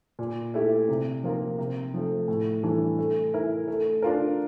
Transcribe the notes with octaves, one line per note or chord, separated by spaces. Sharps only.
A#2
A3 E4 G4
C3
F3 A#3 F4 A#4
C3
F3 A3
A2
E3 G3 D4 A4
A3
E4 A#4
A3
D4 F4 A#4